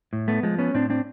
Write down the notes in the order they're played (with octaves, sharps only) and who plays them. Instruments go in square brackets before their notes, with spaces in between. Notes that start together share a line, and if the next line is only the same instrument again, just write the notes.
[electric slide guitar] A2
A3 B3
F3 G#3
B3 C#4
A2 C4 D4
C4 D4